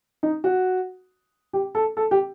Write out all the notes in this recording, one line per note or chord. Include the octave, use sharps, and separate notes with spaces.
D#4
F#4
G4
A4
A4
G4